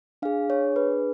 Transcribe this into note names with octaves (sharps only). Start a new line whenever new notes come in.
D4 G#4 F5
C#5
B4